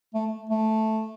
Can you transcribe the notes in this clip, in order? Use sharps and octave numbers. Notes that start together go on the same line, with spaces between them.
A3
A3